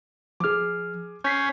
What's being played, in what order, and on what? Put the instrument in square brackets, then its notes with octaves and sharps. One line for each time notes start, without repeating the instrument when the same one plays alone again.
[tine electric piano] F3 F6 [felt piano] G#4 D6
[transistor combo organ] C#4 [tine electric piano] G6 B6 C7